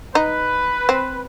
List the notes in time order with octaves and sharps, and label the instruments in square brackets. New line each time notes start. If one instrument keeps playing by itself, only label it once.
[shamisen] D#4 [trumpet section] B4
[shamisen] C4